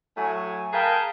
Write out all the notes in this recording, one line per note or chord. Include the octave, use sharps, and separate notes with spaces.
A2 F#3 A3 G#5
G#4 A#4 B4 F5 G5 A5